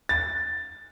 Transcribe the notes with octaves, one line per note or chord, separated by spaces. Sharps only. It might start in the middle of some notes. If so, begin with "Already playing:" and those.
A6